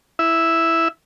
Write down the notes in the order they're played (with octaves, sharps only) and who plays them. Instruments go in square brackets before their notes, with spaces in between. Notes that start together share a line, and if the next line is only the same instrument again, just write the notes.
[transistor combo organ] E4 E5